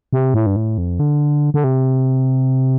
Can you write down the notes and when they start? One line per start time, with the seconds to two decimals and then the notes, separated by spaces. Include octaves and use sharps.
0.13 C3
0.34 A2
0.46 G2
0.56 A2
0.78 F2
1.00 D3
1.54 D3
1.64 C3